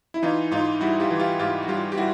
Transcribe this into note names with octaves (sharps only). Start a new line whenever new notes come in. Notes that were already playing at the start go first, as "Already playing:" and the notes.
E4
E3 D#4 F4
G#2 D#4 F4
G3 E4 F#4
F4 G4
E3
F4 G4
G#2 F4 G4
F#4
G3 F4 G4
G4
G3 E4 F#4